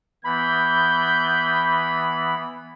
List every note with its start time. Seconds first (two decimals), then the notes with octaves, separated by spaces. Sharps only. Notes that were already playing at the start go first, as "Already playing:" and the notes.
0.25 E3 B3 B5 G6